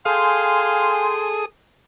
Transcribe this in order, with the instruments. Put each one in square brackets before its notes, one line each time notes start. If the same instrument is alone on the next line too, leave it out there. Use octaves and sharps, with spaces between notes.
[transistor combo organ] G#4 A4 D#6 [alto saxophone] F5 [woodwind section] G5 G#5 C6